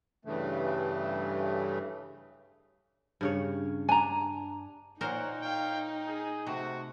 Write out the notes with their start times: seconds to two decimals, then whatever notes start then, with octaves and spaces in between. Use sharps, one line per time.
0.25 G2 C#3 E3 A3
3.21 G2 C#3 C#5
3.89 D4 G#5 A#5
5.01 A#2 D#4 A#4 C5 C#5 F#5
5.42 C#5 F5 G5
6.07 G#4
6.46 C3 A3 F#4